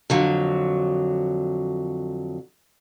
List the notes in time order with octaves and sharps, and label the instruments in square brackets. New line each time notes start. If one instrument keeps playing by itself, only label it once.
[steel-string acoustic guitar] F2 D3 F#3